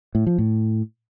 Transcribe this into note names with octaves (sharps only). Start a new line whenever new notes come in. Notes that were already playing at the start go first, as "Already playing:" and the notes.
A2
F3
A2